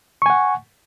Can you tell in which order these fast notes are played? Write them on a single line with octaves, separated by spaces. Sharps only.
C#6 G#5 F#5